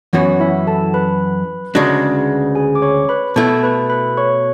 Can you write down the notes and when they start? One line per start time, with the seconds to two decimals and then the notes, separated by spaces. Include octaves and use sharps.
0.13 F#2 E3 B3 C#4 F#4 C#5
0.40 E4 E5
0.67 A4 A5
0.94 B4 B5
1.75 D2 C#3 G#3 D4 F#4
2.55 G#4 G#5
2.75 D6
2.82 C#5 C#6
3.09 B4 B5
3.36 B2 A3 E4 A4 A5
3.63 B4 B5
3.90 B4 B5
4.17 C#5 C#6